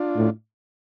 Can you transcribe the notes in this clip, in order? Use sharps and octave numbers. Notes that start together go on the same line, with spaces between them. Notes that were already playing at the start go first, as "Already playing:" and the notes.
Already playing: D4 F4
A2